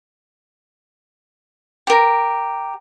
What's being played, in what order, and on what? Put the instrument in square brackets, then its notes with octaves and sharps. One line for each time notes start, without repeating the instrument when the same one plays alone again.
[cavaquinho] G4 A#4